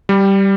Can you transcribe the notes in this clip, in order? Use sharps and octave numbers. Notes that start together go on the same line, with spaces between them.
G3